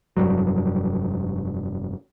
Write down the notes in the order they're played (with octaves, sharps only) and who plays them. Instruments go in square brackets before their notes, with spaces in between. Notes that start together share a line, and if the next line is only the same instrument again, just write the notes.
[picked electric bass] F1 G2 F#3